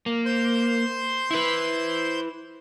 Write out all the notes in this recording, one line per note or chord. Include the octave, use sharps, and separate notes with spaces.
A#3
C5 C6 G6
E4 B4